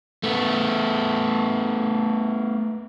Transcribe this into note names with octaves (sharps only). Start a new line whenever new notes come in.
A3 B3